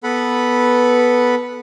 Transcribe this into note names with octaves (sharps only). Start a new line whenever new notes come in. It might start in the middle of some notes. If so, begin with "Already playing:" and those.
B3 A4 B4 F#5 B5